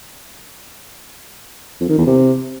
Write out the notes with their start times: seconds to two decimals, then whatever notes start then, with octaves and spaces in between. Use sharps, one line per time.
1.80 F2
1.89 D#3
1.98 E2
2.07 C3